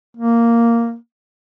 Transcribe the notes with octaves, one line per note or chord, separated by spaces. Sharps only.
A#3